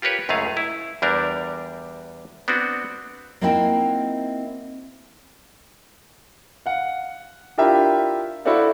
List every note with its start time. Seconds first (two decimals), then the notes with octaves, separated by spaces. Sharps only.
0.02 F4 G4 A#4 B4 C#5
0.29 C#2 F#2 A3 G#4 F5
0.57 E4
1.02 E2 G3 D4 G4 A#4
2.48 B3 C4 D4 F#4
3.41 A#3 C4 D#4 E4 F#4 G5
6.66 F5 F#5
7.58 D4 E4 F4 G4 A#4 E5
8.45 E4 F#4 A4 C5 D5 F5